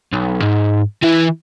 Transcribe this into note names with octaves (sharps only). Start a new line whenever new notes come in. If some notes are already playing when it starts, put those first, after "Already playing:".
B1
G#2
E3 E4